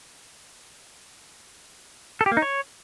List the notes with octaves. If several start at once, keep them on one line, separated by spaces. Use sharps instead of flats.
A4
G4
A#3
D#4
C#5